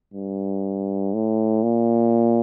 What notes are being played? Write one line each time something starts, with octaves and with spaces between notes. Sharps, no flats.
G2
A2
A#2